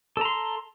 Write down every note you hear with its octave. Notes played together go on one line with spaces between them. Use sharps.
A4 A#5 C6